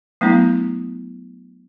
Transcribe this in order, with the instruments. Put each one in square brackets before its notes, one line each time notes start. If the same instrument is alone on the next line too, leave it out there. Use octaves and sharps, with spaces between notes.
[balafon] F#3 A3 B3 D4 E4